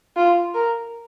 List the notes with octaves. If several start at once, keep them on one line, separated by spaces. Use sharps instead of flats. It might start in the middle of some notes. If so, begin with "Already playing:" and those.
F4
A#4